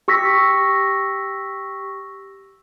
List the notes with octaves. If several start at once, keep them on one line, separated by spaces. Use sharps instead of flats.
G4 C#6 E6 A#6 B6